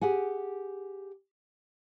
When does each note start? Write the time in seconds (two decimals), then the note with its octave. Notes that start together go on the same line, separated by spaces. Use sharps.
0.01 G4 G#4 F#5 G#5